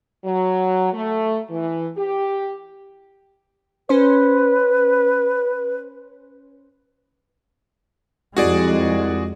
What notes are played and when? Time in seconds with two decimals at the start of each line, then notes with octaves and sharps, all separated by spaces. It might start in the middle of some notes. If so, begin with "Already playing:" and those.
0.25 F#3
0.93 A3
1.51 E3
1.98 G4
3.89 C#4 B4 C5
8.37 C2 F2 G#3 F#4 G#4 D5